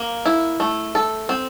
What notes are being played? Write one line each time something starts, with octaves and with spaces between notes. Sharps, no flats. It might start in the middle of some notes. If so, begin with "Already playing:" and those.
Already playing: A#3
E4
A3
A4
C4